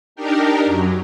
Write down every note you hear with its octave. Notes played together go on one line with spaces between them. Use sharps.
D4 D#4 G4 A#4
F#2 F#3